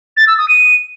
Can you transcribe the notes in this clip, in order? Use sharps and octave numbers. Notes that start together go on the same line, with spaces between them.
A6
E6
D#6
D#7